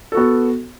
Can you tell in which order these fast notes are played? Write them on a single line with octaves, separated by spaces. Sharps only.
A4 F#4 B3